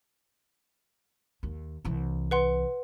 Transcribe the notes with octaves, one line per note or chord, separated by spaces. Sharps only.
D#2
C2 E3
B4 F#5 C6